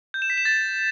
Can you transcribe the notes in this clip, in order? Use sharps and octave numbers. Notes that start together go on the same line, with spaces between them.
G6
E7
B6
E7
A6